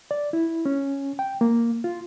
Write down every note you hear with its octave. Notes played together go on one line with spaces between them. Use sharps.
D5
E4
C#4
G5
A#3
F4